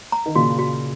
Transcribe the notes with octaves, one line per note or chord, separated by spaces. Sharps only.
A#5
D#3
A#2 C#3 F#4
F#4